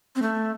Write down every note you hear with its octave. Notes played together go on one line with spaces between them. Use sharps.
C4
A3